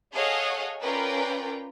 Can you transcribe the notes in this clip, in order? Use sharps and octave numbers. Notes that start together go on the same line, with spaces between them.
G#4 A4 C#5 D#5 F5 F#5
C#4 F4 A#4 B4 D5 G5